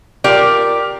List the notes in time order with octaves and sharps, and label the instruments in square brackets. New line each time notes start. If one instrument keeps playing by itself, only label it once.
[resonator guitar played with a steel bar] F4 G4 A#4 D5